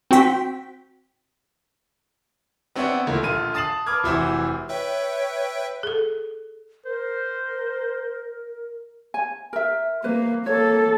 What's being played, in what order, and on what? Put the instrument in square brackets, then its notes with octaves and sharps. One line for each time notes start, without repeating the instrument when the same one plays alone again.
[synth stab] C4 F#4 G5 B6
[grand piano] B3 C4 D4 C#5 E5 F#5
C#2 A3 A#3 E4
A#1 D3 F4 D#7
A5 D#6 A6 C7 E7 F#7
B4 A5 D6 F6 G#6
F1 E3 E4 F#4 C5
[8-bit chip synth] B4 E5 G5 [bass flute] C#5
[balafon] G#4 A4
[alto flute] A#4 [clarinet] C5
[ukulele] G#5
A#4 E5
[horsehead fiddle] A#3 [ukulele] B4 C5
[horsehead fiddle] A#3 A4 [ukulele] C#5